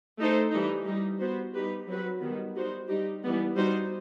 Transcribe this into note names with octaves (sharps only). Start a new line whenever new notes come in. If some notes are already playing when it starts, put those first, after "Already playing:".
A3 D#4 A4 C5
E3 G3 D#4
G3 D#4 G4
B3 F#4 C5
G3 D#4 G4 B4
F#3 C4 F#4 B4
D#3 G3 B3
G3 D#4 F#4 C5
G3 D#4 G4
E3 G3 B3
G3 D#4 F#4 C5